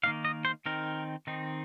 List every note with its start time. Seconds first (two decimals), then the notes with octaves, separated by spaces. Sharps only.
0.03 D#3 A#3 D#4 F5
0.25 D#5
0.45 C5
0.66 D#3 C4 D#4 A#4
1.27 D#3 C4 D#4